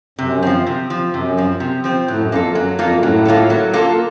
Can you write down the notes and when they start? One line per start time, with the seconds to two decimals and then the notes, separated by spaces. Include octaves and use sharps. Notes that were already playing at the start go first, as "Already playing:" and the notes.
0.19 F#2 C3
0.42 F3 C4
0.67 C3
0.90 F3 C4
1.13 F#2 C3
1.37 F3 C4
1.60 C3
1.84 F3 C4
2.08 A2 F#3
2.19 F#2
2.32 F2 A#3 F4 A4
2.44 F#2
2.55 F#3
2.79 F2 A#3 F4 A4
2.91 F#2
3.02 A2 F#3
3.25 A#3 F4 A4
3.50 F#3
3.73 A#3 F4 A4